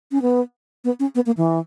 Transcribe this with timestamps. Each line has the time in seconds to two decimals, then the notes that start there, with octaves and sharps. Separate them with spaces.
0.12 C#4
0.22 B3
0.84 B3
1.00 C#4
1.15 B3
1.26 A#3
1.37 E3